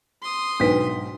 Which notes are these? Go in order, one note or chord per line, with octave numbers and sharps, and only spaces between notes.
C6 D#6
B1 G#2 D4 B4 G#5 B6